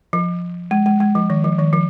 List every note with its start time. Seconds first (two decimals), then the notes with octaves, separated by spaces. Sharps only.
0.13 F3
0.71 G#3
0.86 G#3
1.00 G#3
1.15 F3
1.30 D#3
1.44 F3
1.59 D#3
1.73 F3